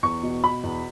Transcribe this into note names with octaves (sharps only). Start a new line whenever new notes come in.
E2 C#6
B2
B2 B5
E2